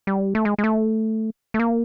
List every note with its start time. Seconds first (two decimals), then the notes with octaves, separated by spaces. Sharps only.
0.07 G3
0.35 A3
0.45 G#3
0.58 G#3
0.64 A3
1.54 A3
1.59 A#3